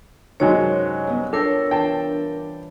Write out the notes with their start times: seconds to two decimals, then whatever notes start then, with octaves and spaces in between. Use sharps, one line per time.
0.40 F#2 C3 D#3 F#3 G#3 D4 C#5
1.07 G2 B3
1.33 D4 F4 A4 A#4 C#5 G5
1.71 E3 F4 G5 A5